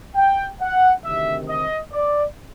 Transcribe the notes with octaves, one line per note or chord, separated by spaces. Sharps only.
G5
F#5
D2 C3 D#3 E5
D#5
D5